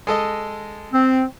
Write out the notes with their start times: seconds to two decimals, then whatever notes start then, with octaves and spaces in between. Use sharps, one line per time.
0.07 G#3 A4 D#5
0.93 C4